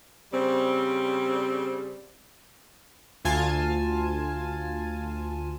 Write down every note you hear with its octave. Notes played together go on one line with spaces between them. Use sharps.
C#3 G3 C4
D2 F4 G#5 A5